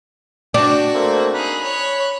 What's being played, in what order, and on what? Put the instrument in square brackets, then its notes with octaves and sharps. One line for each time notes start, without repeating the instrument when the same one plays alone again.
[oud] D4 [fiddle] F#4 [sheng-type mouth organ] G5
[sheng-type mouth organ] A3 A#3 C4
[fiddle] D#4 G#4 [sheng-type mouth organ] B5 F#6
[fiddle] C#5